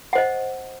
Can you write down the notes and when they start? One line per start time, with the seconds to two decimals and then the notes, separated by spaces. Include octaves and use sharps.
0.13 F#5
0.15 C5
0.18 D#5